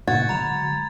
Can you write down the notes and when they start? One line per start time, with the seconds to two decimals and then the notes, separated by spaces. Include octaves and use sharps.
0.08 A#2 C#3 A#3 F#4 G#6 A6
0.29 D3 F#3 G#3 A#5 B5 F7